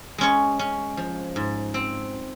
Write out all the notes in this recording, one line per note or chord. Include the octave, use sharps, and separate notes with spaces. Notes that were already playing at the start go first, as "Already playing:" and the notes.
G#3 C#4 C#5
C#4
F3
G#2
C4